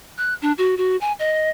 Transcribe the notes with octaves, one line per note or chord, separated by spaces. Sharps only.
F#6
D4
F#4
F#4
G#5
D#5